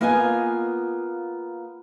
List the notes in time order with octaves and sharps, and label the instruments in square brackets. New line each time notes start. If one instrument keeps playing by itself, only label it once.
[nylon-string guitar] A#3 B3 F4 D#5 G5 G#5